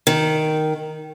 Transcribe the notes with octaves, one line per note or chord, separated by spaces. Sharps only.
D#3